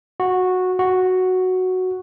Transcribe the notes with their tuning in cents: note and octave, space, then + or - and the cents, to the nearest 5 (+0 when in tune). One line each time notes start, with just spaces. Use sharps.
F#4 -10
F#4 +0